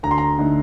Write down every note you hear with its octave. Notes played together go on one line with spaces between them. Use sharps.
D2 A#5
C6
A#5
D3 A3 D#4